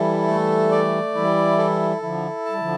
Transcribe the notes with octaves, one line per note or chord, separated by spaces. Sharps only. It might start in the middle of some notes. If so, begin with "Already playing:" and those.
Already playing: E3 G3 E4 A4
A3
D5
E3 G3 E4
A4
D3 F3 E4
A5
G3
D3 F3